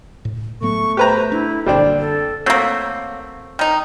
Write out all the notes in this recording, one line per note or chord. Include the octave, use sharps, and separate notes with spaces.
A2
A2 F#3 A3 B3 C#6
G4 B4 C5 A#5
D4 E4
F#1 A#2 D3 G3 C4 D4 D5
A4
F#3 A3 A#3 C4
D#3 D#4